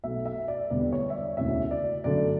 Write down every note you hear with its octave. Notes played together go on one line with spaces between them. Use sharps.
B1 B2 A3 E5
E5
D5
E1 E2 D3 G3 B3 D5
C#5
E5
D5
E1 D2 C#3 E3 E5
D5
G1 F#2 D3 A3 D5